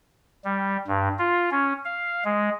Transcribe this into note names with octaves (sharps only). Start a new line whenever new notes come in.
G3
G2
F4
C#4
F5
G#3